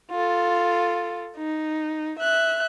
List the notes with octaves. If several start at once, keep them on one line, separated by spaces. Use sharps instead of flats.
F4 A4
D#4
E5 F#6